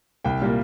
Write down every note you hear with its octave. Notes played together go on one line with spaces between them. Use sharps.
C2 G5
A#2 G3 A#3